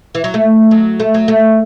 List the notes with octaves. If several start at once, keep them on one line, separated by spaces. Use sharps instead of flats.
E3
F#3
A3
F#3
A3
F#3
A3